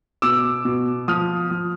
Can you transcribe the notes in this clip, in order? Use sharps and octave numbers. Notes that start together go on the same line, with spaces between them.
B2 D6 E6
B2
F3 D#6 F6
F3